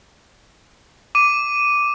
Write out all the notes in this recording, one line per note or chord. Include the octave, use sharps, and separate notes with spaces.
D6 D#7